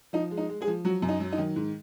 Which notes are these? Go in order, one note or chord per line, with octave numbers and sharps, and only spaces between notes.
F3 D#4
G#3
D#4
G#3
G#3 G#4
F3
F#3 F#4
F#2
D#4
F#3
D#4
D#3
G#2